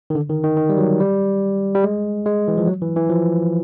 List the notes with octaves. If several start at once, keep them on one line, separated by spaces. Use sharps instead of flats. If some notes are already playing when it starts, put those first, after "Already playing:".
D#3
D3
D#3
D#3
D#3
G3
F#3
G3
G3
G#3
G#3
E3
F3
F#3
E3
E3
F3